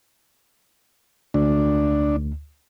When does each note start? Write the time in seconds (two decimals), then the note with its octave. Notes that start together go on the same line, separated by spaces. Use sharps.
1.34 D2 D4